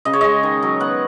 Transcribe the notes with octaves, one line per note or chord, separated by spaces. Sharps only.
C#3 D#5
C#5
G#3 D#5
D#3
F#3
B3 F#5